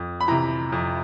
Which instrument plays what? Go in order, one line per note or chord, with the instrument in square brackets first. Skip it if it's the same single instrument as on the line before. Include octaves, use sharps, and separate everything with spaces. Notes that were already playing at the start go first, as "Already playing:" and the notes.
Already playing: [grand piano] F2
B5
C3 E3 A#5
F2